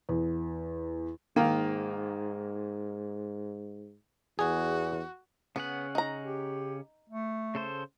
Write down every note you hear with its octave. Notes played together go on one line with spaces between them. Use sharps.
E2
G#2 D#3 A#3
E2 F#4 G#4
C#3 B3 C#4 F#5
D#4 A#5
G4
A3
C#3 A4 C5